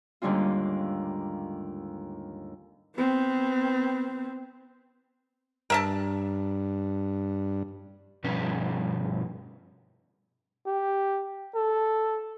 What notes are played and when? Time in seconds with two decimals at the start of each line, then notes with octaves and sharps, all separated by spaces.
0.22 D#2 G#2 D3 G3 C#4 F4
2.96 B3 C4
5.70 G2 A#4 E5 A5
8.24 G2 B2 F3 C#4 B4
10.66 G4
11.55 A4